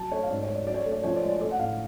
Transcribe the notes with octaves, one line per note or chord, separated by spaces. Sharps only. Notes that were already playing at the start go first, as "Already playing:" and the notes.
Already playing: F#3 A5
A3 C#5
F5
G#2 D5
C#5
G#3
D5
F#3 D5
C#5
D5
A3
D5
F3 C#5
D5
G#3
D5
A3 D5
F#5
A2 F5